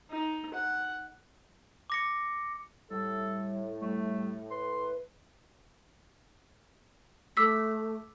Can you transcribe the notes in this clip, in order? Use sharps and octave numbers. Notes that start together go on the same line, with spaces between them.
D#4
F#5
D6 A#6 C#7
A2 G3 A4
G3 A3
B4 C6
A3 D6 E6 B6